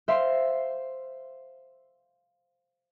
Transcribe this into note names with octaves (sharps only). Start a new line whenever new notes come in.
C5 E5 F5 C6